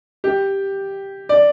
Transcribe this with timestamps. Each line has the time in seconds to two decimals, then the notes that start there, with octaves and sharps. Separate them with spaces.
0.24 G4
1.29 D5